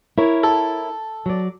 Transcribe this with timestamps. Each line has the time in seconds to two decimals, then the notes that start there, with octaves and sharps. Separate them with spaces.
0.18 E4 A#4 C#5
0.44 A4
1.26 F#3 D5